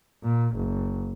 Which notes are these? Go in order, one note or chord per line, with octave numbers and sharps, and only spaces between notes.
A#2
F#1